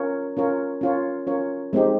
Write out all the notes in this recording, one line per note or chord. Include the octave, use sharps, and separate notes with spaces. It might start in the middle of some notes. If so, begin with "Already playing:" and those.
Already playing: C#4 F4 A#4 C#5
C#4 F4 A#4 C#5
C#4 F4 A#4 C#5
C#4 F4 A#4 C#5
G#3 C4 D#4 G4